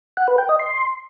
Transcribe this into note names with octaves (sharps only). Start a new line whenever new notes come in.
F#5
B4
G5
D#5
C6